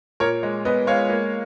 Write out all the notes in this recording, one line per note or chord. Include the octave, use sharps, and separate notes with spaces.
A#2 A#4 C#5
G#3
B3 B4 D#5
G#3 C#5 F5
A#3